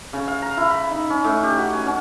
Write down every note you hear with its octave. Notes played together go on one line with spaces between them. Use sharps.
C#3
F5
A#5
E4
B5
D#4
C#4
A2
G4
F#4
G#5
C#4